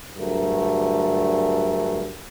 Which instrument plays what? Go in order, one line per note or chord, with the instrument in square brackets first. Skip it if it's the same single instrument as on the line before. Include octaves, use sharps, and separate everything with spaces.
[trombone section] D2 G2 F#3 A3 G#4 A#4